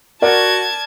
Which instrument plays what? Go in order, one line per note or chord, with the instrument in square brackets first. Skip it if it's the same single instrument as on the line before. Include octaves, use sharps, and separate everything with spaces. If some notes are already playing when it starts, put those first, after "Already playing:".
[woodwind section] F#4 [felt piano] A#4 D5 [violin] A5 G#6